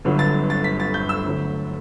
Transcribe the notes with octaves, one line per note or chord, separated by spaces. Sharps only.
G1 G2 D3 F#3
A6
A6
B6
A6
G6
E6
D2 D3 F#3